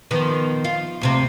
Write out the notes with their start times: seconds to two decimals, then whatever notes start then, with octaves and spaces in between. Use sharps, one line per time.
0.11 D#3 F3 B3
0.64 F4
1.01 D2 C3 C4